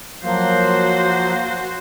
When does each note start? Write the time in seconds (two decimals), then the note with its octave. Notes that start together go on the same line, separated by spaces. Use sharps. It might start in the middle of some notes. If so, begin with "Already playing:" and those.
0.24 F3 F#3 A#3 F#4 C5